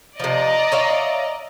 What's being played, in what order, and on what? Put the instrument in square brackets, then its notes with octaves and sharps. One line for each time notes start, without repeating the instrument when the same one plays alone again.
[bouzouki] C3 F3 [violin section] D5 D#5 A#5
[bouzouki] C#5 E5 F5